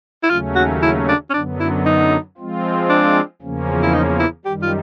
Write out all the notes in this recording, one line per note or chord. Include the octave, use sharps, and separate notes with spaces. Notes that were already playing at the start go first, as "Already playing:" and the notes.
E4
D#2 C#3 F#3 A3 C#4 F4
F#4
E4
D4
C#4
F#2 D3 F#3 B3 D4
E4
D#4
F3 G#3 C4 F4
D4
E2 C#3 F3 A#3 C#4
E4
D#4
E4
F#2 D#3 G3 G4
F4